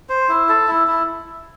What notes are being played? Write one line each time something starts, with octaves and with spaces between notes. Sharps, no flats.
C5
E4
A4
E4
E4